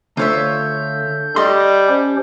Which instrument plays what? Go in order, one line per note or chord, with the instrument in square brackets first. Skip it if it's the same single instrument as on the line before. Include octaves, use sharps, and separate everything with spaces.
[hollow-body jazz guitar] D2 [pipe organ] D4 A4 G6 [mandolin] F4 C#5 E5
[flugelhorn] G3 [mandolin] A4 [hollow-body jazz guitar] D#5 C6
[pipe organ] C#4 G4 C5